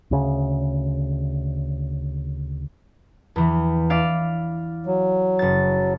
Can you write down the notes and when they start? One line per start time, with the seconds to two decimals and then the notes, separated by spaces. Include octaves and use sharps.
0.11 D2 C#3
3.36 E2 E3
3.90 E4 D5 F5
4.86 F#3
5.39 F#1 A6